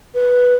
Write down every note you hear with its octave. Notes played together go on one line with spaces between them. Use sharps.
B4